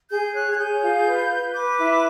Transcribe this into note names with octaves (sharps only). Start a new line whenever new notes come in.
G#4 G6
C#5 F#6
G#6
G#4 G6
F4
B4
B4
B4 D6
E4